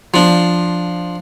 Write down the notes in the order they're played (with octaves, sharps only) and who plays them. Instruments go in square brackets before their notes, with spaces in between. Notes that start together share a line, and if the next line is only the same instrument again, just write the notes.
[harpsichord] F3 D4